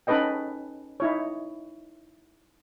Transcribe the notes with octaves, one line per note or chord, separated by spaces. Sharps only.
C#4 D#4 A4 B4 D#5 G5
D#4 E4 C#5